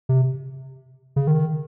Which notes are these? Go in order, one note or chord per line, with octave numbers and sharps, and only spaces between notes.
C3
C#3
D#3